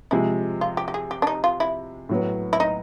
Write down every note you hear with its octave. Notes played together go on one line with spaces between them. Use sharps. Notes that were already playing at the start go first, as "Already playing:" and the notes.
C3 F3 G#3 E4
F4
G4
G4
G#4
G4
D4
D#4
F4
E4
A2 F#3 B3
E4
D#4